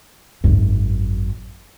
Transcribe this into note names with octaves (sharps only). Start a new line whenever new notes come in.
G#1 F#2